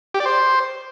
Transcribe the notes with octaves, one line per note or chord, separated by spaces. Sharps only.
G4
D5
C5